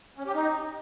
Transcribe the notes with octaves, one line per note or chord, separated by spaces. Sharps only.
C#4
G4
D#4